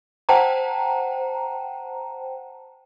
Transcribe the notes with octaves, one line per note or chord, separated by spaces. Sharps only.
C5 F#5 G5 A5 A#5